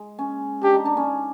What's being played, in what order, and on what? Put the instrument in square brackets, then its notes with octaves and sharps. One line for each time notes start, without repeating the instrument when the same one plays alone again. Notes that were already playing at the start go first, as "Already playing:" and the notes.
Already playing: [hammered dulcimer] G#3
C#4
[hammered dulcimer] D4 [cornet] G4
[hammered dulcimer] D#4
D4
C#4